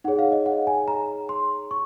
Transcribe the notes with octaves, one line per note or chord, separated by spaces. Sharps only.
D#4 G#4 C#5 F#5
F5
D#5
F#5
G#5
A#5
C6
C#6